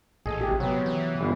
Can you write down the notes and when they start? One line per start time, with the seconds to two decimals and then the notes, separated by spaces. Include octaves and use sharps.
0.26 A1 G#4 A4 D#5
0.41 G4
0.60 C3 F#3 B3
0.86 E3
1.21 G1 F5